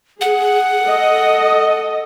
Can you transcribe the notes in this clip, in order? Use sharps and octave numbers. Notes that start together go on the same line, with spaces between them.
G#4 F#5
A4 D#5